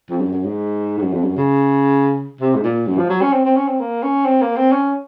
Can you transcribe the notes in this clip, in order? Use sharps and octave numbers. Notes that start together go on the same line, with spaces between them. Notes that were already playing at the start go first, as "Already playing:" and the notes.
F2
F#2
F#2
G#2
G#2
F#2
F2
F#2
C#3
C3
G#2
A#2
F#2
F3
F#3
C#4
C4
C4
C#4
C4
A#3
C#4
C4
A#3
C4
C#4